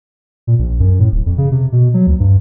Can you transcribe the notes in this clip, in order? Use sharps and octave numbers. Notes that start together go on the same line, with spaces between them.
A#2
A#1
F#2
A2
D1
F2
C#3
C3
B2
F#3
D2
G2